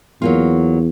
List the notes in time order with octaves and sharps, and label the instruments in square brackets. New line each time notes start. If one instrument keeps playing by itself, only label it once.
[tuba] E2 [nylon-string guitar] F#3 A#3 F4